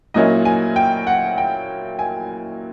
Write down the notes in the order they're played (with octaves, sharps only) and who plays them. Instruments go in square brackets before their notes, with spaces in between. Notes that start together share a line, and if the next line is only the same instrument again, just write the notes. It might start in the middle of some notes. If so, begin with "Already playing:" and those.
[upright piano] A#2 F#3 A#3 C#4 E4 [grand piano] D#5
[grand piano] G#5
G5
F#5
G5
G#5